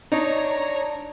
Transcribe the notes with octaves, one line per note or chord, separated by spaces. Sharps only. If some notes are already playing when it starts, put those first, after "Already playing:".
D4 D#4 C#5 A#5